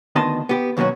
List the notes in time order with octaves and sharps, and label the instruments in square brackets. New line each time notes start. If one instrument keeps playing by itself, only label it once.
[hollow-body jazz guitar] D2 D#3 B3 D#5 A5 C6
B3 G4
D#2 B2 F#3 C#4 F#4